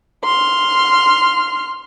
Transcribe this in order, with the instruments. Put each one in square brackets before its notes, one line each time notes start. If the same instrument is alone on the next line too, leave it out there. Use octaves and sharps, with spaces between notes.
[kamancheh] C6 F6